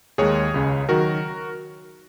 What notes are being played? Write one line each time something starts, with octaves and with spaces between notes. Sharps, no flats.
D#2 D#3 G#3 G#4 C#5
C#2 C#3 G#3
D#3 F#3 F#4 A#4